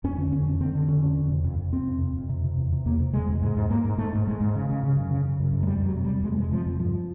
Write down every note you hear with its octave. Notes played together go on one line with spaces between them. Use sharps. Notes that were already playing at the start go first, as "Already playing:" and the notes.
F2 C#4
D3
F2 C#4
D3
D3 C4
D3
F2 C#4
D3
F2
C3
F2
F2
F2 C4
C3
F2
F2
C3
C3
E2
C3
E2 A#3
C3
C3 G#3
E2
G#2 G#3
G#2
G#2 A#3
G#2
G#2 A3
G#2
G#2 G#3
G#2
C#3
C#3
C#3
F#2
C#3
C#3
F#2
F#2
G#3
F2 G3
F2 F#3
C3
G3
F2
F2 G#3
A3
C3 G#3
C3 F3
F2
G2 F3